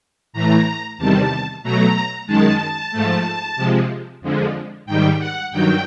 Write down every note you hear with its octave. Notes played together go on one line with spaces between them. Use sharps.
A2 E3 A3 A#5
E2 C3 D#3 G3 A5
B2 F#3 A3 A#5
F#2 D#3 G#3 A5
G#2 F3 A3
C3 F3 G#3
F2 D3 F3 G#3
G#2 D#3 G3 G5
F#5
G2 D#3 F#3 G5